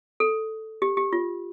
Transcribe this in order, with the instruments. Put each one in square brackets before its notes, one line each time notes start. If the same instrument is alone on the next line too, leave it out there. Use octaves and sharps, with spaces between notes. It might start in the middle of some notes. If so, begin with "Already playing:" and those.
[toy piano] A4
G4
G4
F4